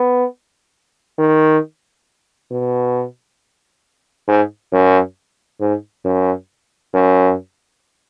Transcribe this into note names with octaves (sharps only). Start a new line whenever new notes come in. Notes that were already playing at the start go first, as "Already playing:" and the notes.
Already playing: B3
D#3
B2
G#2
F#2
G#2
F#2
F#2